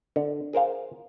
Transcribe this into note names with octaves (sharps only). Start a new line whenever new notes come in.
D3
G#4 A#4 C5 F5